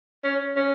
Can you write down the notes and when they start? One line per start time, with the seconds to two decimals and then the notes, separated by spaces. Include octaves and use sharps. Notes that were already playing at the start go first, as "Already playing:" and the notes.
0.24 C#4
0.57 C#4